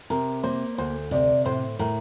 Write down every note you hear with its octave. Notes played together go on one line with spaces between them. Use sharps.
C3 A#4
A#3 C5
D2 C5
C3 D5
A2 C5
A2 A#4